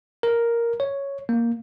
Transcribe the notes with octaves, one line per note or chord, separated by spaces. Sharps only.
A#4
C#5
A#3